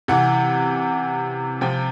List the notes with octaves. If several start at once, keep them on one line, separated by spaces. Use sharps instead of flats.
C3 E3 F#5
C3 F3 G5